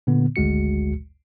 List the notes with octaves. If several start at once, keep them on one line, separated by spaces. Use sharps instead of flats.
A#2 D3 B3
G#1 D2 G#3 F#4 C#7